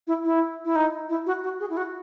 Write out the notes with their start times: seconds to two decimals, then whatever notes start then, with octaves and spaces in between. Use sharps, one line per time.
0.07 E4
0.24 E4
0.65 E4
0.76 D#4
1.09 E4
1.26 F#4
1.43 F#4
1.60 G#4
1.70 E4
1.77 F#4